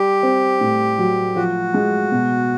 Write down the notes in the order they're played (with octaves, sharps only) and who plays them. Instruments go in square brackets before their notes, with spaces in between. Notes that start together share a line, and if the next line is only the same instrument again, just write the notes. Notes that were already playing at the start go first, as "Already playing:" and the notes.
Already playing: [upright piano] G3 [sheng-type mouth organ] G4
[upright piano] C4
A2
F#3
[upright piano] F3 [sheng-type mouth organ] F#4
[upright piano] G#3
B2